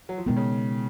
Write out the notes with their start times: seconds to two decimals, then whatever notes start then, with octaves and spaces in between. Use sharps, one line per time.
0.09 F#3
0.18 F3
0.26 B2 D#3 G#3 B3
0.37 C#3